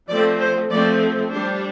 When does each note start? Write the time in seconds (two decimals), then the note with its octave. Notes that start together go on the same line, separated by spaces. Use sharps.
0.09 F3 A3 C4 D5
0.40 C5
0.70 F3 A3 C4 D5
1.32 G3 D4 C5